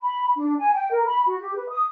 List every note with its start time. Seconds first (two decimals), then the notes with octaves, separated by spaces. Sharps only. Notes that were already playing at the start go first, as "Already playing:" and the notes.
0.01 B5
0.35 D4
0.58 G#5
0.74 G5
0.91 A#4
1.07 B5
1.26 F#4
1.40 G4
1.55 B4
1.69 D#6